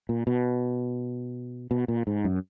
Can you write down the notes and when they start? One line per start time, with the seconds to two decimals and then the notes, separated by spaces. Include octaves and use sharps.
0.09 A#2
0.27 B2
1.71 B2
1.88 A#2
2.07 G#2
2.24 F#2